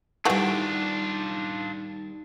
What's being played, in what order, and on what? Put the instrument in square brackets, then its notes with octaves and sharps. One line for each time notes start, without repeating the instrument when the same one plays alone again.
[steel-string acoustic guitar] D#2 G3 [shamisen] E3 A3 F#4 [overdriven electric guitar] D4 F4 [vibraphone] D#4